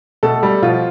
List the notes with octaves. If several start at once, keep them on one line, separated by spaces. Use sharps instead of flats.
B2 A3 A4
G3
B2 F3 F4